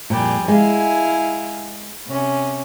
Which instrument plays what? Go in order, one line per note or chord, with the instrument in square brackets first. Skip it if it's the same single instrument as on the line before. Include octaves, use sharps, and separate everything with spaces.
[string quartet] F2 G3 G#4 [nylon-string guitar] A#2
[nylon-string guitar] G#3 [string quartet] E4 F5 G#5
[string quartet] C3 C#4